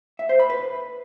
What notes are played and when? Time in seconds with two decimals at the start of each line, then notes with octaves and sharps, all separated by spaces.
0.19 E5
0.29 C5
0.40 B5
0.50 B4